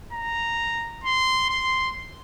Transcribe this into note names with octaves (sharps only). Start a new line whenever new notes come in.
A#5
C6
C6